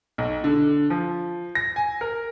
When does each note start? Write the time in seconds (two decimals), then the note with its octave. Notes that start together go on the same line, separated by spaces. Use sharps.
0.18 B1
0.44 D3
0.90 F3
1.55 A#6
1.76 G#5
2.01 A#4